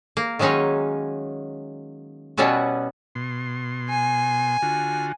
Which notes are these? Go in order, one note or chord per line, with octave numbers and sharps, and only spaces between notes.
A#3
D#3 F#3 G#3 C#4 D#4
B2 G3 B3 C#4 E4 F#4
B2 C6
G#5
D3 F4 F#4